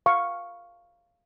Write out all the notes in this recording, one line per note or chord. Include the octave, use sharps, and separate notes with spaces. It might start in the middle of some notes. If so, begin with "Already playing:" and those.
F5 C#6